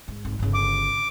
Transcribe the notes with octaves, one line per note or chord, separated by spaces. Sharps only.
G#2
G#1 A#3
G1 C#3
D6